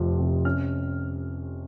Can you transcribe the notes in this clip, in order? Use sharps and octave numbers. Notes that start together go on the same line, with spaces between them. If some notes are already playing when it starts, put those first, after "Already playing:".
Already playing: F1 F2 C3 F3
C3
C#4 F6